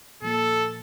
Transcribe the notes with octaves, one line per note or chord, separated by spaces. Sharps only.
A#2 F3 A#3 A4